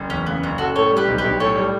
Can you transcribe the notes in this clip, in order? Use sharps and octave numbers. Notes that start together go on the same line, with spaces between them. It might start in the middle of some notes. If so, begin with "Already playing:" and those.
Already playing: F#1
E2 C#4
C#3 B3
F#1 C#4
F#1 F#4 A4
A2 A4 C#5
G3
G4 B4
B1
G4 B4
B1
A2 A4 C#5
G3